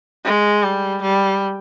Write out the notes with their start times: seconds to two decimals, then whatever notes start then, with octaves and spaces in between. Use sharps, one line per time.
0.25 G#3
0.63 G3
1.02 G3